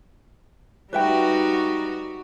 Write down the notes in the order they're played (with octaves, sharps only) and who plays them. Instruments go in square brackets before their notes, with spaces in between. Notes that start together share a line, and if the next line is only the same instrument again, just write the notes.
[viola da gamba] G3 D#4 F#4 [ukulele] B4 E5 G5